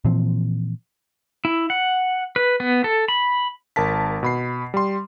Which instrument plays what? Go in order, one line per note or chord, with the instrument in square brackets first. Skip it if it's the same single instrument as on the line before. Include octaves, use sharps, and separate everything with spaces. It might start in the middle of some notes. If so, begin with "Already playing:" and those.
[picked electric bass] A#2 E3 F3 C4
[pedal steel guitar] E4
F#5
B4
B3
A4
B5
[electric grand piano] G#1 A#4 A5 B6
B2 B5 C7
G3 C6